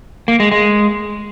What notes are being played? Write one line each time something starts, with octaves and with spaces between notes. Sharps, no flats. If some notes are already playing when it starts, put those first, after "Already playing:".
A#3
G#3
G#3